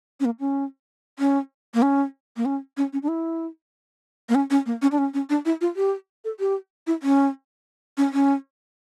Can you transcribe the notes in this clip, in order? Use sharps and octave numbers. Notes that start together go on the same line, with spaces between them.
C#4
A#3
C#4
C#4
A#3
C#4
A#3
C#4
C#4
C#4
D4
E4
A#3
C#4
C#4
A#3
C#4
D4
C#4
C#4
D4
E4
F4
G4
A4
G4
E4
C#4
C#4
C#4